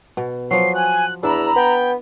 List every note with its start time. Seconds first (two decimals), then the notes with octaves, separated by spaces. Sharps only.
0.17 B2
0.51 F3 F#3 C7
0.75 G#5 F#6
1.23 E2 D4 E4 A#5 B5 E6
1.56 B3 G5